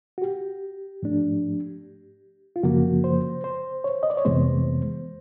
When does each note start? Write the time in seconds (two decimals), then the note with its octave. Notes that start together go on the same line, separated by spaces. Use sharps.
0.18 F#4
0.22 G4
1.03 G#2 F3 A3 D4
2.56 F4
2.63 F#2 C#3 F3 A#3 F#4
3.04 C5
3.44 C5
3.84 C#5
4.03 D#5
4.10 D5
4.17 C#5
4.25 F2 C3 E3 G#3 B3 C5